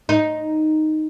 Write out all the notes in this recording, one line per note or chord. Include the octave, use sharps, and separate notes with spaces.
D#4